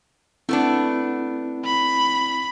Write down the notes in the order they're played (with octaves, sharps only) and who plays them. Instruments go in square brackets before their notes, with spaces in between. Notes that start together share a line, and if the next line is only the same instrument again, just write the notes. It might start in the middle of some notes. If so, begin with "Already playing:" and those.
[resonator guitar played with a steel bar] A3 B3 D4 [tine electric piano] C4 E4
[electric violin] B5